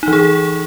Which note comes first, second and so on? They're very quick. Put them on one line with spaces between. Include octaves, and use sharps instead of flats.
D#4 E3 G#4